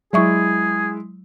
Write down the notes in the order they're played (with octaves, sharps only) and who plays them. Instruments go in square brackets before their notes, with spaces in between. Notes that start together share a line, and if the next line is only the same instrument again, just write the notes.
[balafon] F#3 E5 C#6 [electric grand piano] G#3 E4 [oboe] G#4